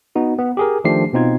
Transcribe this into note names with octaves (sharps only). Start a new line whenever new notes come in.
B3 D#4 F#4
B3
G4 G#4 A#4
D#3 F3 A3 D4 G4 C7
B2 B3 C4 D#4 F4 G#6